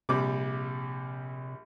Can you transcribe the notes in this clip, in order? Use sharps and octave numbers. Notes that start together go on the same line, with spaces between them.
A#1 C3 G3 D6